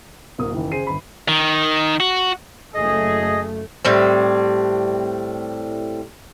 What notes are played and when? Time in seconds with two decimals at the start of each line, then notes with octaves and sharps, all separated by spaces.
0.38 D1 A#3 F#4 D#6
0.51 F#1 D#3 E3
0.71 C#3 G#4 C5 C7 D#7
0.87 G1 B5
1.29 D#3
2.00 F#4
2.74 F#1 A3 G#4 D#5
3.85 A2 G3 C4